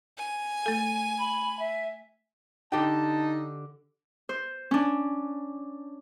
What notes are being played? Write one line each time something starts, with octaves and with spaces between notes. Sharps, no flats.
G#5
A3 A4
B5
E5
D3 D#4 G4 G5 A5
C5
C#4 D4